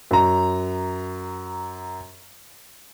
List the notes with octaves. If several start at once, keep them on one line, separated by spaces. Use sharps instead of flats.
F#2 A#5